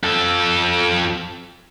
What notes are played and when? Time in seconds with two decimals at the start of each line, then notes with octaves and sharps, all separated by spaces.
0.03 F2 A4